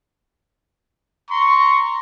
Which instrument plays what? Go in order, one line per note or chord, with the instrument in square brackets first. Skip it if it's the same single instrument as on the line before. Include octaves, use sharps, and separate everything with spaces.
[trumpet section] A#5 C6 C#6